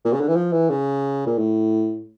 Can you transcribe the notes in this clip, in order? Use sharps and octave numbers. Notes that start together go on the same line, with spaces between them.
A#2
C#3
D3
E3
F3
E3
C#3
A#2
A2